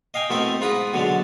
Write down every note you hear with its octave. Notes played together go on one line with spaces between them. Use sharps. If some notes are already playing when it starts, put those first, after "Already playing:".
D#5 F5 G5 G#5
B2 A3 C4 E4 A#4 D#5
G#2 F4 B4 A#5 B5 D#6
B2 D3 F#3 G#3 D4